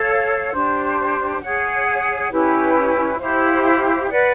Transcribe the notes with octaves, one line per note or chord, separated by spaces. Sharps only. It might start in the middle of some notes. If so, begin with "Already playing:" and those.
Already playing: A4 C#5 F5
D4 G4 C5
G#4 C#5 F#5
C#4 E4 G4 B4
E4 G4 C5 F5
B4 D5 F#5